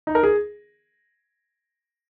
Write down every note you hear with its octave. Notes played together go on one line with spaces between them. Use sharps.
D#4
A#4
G#4